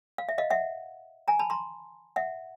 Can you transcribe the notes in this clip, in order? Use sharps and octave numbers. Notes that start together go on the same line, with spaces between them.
F5
E5
D#5 F5
E5 F#5
G#5 A#5
A5 B5
A#5 C6
E5 F#5